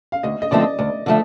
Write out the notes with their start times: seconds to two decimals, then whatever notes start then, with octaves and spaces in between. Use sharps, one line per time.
0.12 F5
0.23 D2 D#5
0.42 D#5
0.51 D3 F3 A3 C4 D5
0.61 D#5
0.78 D2 D5
1.06 D3 F3 A3